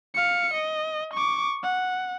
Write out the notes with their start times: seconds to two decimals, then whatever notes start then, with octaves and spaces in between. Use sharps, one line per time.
0.14 F5 C#7
0.54 D#5
1.14 C#6 D6
1.63 F#5